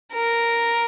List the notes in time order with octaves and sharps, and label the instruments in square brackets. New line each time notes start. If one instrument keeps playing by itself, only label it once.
[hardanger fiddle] A#4